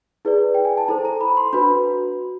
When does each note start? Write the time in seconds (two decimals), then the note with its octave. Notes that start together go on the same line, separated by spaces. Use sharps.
0.25 E4 G#4 B4 D5
0.55 G5
0.65 G#5
0.77 A5
0.88 E4 A4 C5 A#5
1.05 A#5
1.21 B5
1.37 C6
1.53 D4 F#4 B4 B5